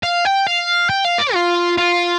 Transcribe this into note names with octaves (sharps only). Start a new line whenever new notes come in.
F5
G5
F5
G5
F5
D5
F4
F4